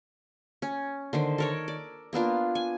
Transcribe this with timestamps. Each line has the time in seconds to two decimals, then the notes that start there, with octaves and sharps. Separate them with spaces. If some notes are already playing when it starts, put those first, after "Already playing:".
0.62 C#4
1.13 D3 D#3 C5
1.38 A4 A#4 C#5
1.68 D5
2.13 A#3 B3 D4 F4
2.55 G#5